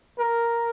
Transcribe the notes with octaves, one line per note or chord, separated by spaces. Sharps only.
A#4